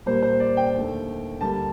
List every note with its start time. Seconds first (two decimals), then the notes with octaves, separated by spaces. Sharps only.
0.06 A#2 G3 A#3 C5
0.22 C5
0.40 D5
0.57 G5
0.74 D#2 D3 A3
1.41 D2 D3 G3 A#3 A5